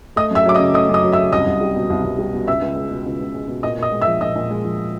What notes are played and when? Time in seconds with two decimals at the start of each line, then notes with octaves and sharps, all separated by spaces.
0.16 A3 D#5 D#6
0.31 F#2 E5 E6
0.46 F#3 D6
0.55 D#5 D#6
0.59 C#3
0.74 A3 D#5 D#6
0.89 F#2 D#5 D#6
1.03 F#3
1.12 E5 E6
1.18 C#3
1.32 C2 D#5 D#6
1.47 C2
1.61 G3
1.76 B2
1.90 C2
2.04 C2
2.18 G3
2.34 B2
2.47 C#2 E5 E6
2.62 C#2
2.76 G#3
2.90 B2
3.06 C#2
3.21 C#2
3.34 G#3
3.48 B2
3.63 A#2 D#5 D#6
3.78 A#2 D#5 D#6
3.92 G#3
4.02 E5 E6
4.07 F3
4.21 A#2 D#5 D#6
4.36 A#2
4.51 G#3
4.65 F3